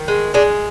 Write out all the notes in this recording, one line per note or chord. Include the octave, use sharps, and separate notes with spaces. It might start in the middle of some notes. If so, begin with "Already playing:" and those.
Already playing: D#3
G#3
G#3 D4